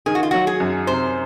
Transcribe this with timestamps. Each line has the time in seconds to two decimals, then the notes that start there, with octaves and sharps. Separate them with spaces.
0.06 D#3 G#4
0.15 F#4
0.23 F4
0.31 F#3 F#4
0.47 G#4
0.60 F#2
0.87 C3 C5